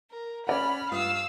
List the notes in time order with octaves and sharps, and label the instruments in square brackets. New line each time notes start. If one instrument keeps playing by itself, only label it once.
[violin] A#4
[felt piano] C#4 D5 F#5 [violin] B5 F6
[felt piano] G2 F4 D#6 [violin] F5 E6